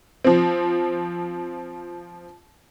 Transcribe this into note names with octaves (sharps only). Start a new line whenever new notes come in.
F3 C4